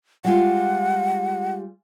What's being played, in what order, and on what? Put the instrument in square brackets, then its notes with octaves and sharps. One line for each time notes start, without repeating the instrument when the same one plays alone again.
[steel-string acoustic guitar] G3 G#3 F4 [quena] F#5